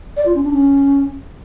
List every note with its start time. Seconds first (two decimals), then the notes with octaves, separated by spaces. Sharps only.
0.17 D5
0.26 F4
0.35 C#4
0.44 D4
0.53 C#4